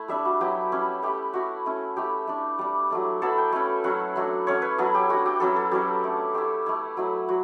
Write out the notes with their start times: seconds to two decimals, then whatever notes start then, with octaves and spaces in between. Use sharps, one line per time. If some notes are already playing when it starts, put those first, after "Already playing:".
Already playing: A3 E4
0.08 G3 D4 E5
0.25 F#4
0.41 F#3 B3 E4 G4
0.72 G3 C#4 E4
1.02 A3 E4 G4
1.33 A3 E4 F#4
1.66 A3 C#4 E4
1.96 A3 E4 G4
2.27 A3 D4
2.59 G3 D4
2.90 F#3 A3 D4
3.22 F#3 B3 E4 A4
3.38 G5
3.52 A3 C#4 E4
3.84 F#3 C#4 E4 F#5
4.16 F#3 A3 D4
4.47 A3 C#4 E4 C#5
4.62 B4
4.78 F#3 B3 E4 A4
4.94 G4
5.09 A3 D4 F#4
5.26 G4
5.40 F#3 C#4 E4 A4
5.56 A4
5.71 F#3 C#4 E4 G4
6.04 A3 D4
6.34 A3 E4 G4
6.66 A3 E4
6.97 F#3 A3 E4
7.28 F#3 F#4